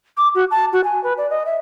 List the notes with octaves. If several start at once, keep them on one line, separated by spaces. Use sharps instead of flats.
D6
F#4
A5
F#4
G#5
B4
D5
D#5
E5